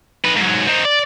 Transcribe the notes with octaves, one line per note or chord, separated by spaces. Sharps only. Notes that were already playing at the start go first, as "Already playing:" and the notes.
D#4 B4
G#2 F#3
C4 D#4
D5